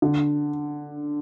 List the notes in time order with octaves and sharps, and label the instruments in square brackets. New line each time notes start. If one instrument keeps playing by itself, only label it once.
[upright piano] D3